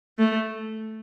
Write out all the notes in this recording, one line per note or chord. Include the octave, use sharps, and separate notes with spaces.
A3